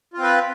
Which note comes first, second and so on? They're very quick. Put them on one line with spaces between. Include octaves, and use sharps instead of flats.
F4 C4 B4